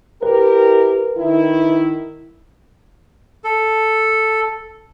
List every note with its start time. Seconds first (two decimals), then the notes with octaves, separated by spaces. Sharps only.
0.23 E4 G4 A#4 B4
1.17 D#3 E4
3.44 A4